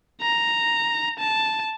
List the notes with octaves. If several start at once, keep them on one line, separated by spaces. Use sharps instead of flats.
A#5
A5